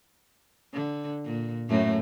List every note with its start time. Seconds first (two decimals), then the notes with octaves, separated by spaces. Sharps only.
0.73 D3
1.25 A#2
1.69 F#2 A2 A3